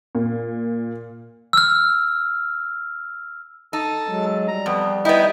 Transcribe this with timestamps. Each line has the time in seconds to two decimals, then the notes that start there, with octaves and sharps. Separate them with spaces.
0.15 A#2
1.53 E6 F6
3.73 D#4 A4 A5
4.08 F#3 G#3
4.48 G3 A#5
4.66 F2 B3
5.05 B3 D#4 E4 D#5 G5